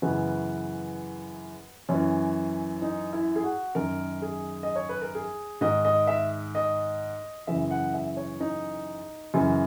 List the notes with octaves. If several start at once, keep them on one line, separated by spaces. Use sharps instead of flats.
F#2 C#3 E3 B3
F#2 E3 C#4
D#4
E4
G#4
F#4
F#2 D#3 A#4
G#4
D#5
C#5
B4
A#4
G#4
G#2 D#3 D#5
D#5
E5
D#5
F#2 C#3 E3 E5
F#5
E5
C#5
D#4
F#2 C#3 E3